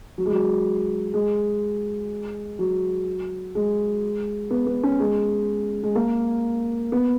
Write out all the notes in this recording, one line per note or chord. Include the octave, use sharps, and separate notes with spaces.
F#3
G#3
F#3
G#3
F#3
G#3
B3
B3
C#4
G#3
G#3
A#3
B3